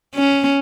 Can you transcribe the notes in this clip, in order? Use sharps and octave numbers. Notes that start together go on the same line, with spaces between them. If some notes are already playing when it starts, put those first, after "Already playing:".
C#4